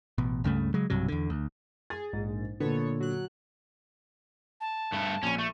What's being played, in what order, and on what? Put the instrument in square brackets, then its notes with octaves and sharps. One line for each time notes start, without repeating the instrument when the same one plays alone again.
[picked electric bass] A1 B2
C#2 G2 C#3 A3
C#3 F#3 G#3
B1 G2 C3 F#3
E2 D3
D2
[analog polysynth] G#4 [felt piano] A6
[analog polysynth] A#1 G#2
[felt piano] A#2 D3 [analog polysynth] B3 A4 C#5
[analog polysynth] F#3 F#6
[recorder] A5
[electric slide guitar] G2 A3
[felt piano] A#1 D#7 [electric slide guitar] C#4
[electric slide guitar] A3 [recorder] C#6